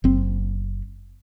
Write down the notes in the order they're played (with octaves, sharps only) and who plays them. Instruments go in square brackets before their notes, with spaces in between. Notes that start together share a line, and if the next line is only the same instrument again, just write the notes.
[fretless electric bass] F#1 C4